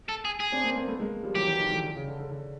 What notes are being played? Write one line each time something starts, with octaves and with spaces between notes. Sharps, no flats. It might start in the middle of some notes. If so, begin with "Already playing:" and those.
A4
G#4
G#4
C4 D4
A#3 C4
A#3 C4
A3 B3
G#3 A#3
F3 G3
E3 F#3 G4
E3 F#3
D#3 F3
D3 E3
D3
C#3
D3
D3
D3